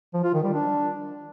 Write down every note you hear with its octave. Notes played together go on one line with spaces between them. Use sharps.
F3
F4
D#3
G3
D4